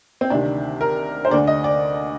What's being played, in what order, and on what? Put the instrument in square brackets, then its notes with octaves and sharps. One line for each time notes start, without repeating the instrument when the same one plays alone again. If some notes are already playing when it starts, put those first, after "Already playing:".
[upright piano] C4
D2 C3 D#3 D4
A#4
C5
D2 D3 D5
D#5
D5